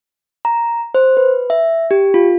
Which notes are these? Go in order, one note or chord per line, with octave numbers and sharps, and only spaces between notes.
A#5
C5
B4
E5
G4
F4